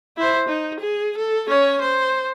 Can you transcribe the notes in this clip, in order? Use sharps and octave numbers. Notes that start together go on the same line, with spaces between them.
E4 C5
D#4
G#4
A4
C#4 C#5
C5